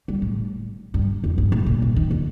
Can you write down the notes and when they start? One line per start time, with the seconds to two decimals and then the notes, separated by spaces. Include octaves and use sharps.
0.08 G3
0.22 A2
0.94 G2
1.24 F2
1.38 G2
1.52 A2
1.66 A#2
1.82 C3
1.96 D#3
2.11 D3